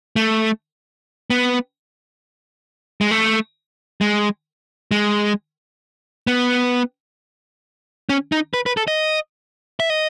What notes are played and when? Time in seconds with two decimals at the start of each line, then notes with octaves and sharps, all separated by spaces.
0.16 A3
1.30 B3
3.01 G#3
3.11 A3
4.01 G#3
4.91 G#3
6.27 B3
8.09 C#4
8.32 D#4
8.54 B4
8.66 B4
8.77 A4
8.88 D#5
9.80 E5
9.90 D#5